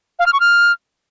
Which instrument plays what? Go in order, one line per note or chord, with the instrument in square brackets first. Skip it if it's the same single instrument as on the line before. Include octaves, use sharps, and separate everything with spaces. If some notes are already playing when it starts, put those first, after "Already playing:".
[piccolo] F5
F6
C#6
F6